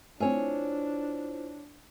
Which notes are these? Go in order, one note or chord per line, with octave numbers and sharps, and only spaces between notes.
A3 C4 D4 E4 F4 C5 C#5 G#5